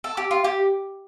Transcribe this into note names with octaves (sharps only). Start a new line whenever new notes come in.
A4
G4
F4
G4